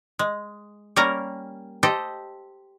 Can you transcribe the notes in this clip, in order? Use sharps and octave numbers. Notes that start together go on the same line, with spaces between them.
G#3
G3 A#3 C#4 A#4 A#5
G4 A4 C5 D#5